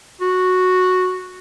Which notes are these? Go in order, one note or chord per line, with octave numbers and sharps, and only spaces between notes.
F#4